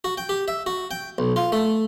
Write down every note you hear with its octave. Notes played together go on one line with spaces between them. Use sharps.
F#4
G5
G4
E5
F#4
G5
B1
F4
A3